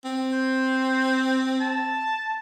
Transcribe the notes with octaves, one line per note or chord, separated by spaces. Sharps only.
C4
C5
A5